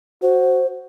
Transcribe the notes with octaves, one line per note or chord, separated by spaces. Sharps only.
F#4 C5